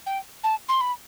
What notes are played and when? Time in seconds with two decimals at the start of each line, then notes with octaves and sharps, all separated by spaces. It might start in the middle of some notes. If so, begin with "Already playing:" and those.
0.06 G5
0.43 A5
0.68 C6
0.80 B5